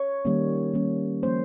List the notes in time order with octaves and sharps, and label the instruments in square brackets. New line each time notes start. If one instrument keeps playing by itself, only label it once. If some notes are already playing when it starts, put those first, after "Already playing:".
Already playing: [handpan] C#5
D#3 G3 A#3 C#4
D#3 G3 A#3 C#4
F3 A#3 C#4 C5